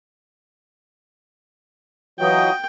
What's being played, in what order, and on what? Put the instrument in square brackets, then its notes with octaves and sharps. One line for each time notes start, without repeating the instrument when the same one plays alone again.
[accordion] E3 F#3 [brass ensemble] F4 F#4 D#5 [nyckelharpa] G5